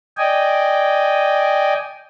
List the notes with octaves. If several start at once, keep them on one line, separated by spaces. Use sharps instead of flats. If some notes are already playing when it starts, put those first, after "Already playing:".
D5 D#5 G5 G#5